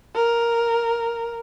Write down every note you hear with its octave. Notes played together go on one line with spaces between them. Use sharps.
A#4